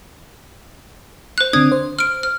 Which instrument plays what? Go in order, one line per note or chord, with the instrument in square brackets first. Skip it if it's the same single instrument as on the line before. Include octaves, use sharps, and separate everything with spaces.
[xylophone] C5 F#6
[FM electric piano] D3 C4 D4 [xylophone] D#6 G#6
[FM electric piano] C5
[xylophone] F6 D7
F6